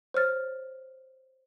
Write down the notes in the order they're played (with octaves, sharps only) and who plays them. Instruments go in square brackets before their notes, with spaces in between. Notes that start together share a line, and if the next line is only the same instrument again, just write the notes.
[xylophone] C5 C#5 F6 A6